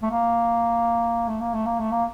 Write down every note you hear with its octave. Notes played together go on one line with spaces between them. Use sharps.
A3
A#3
A3
A#3
A3
A#3
A3
A#3